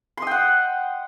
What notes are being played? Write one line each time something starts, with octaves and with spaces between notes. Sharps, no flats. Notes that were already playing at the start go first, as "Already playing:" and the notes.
D#5 F#5 G5 C6